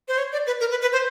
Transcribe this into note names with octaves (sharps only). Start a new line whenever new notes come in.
C5
C#5
D5
B4
A#4
B4
B4
C5